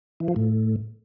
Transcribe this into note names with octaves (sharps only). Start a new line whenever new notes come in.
E3
F3
A2